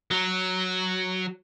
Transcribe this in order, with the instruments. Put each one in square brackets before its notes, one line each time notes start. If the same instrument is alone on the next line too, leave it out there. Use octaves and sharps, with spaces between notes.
[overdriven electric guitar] F#3